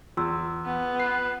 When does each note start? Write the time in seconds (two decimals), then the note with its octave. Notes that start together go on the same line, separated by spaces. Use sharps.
0.17 E2 F4 C6 E6
0.65 B3
0.99 B4 C7